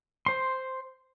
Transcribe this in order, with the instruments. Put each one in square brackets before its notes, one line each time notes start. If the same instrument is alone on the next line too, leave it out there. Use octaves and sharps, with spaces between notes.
[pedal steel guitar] C5 C6